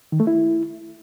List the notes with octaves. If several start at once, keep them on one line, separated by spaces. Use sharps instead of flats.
D#3
A3
E4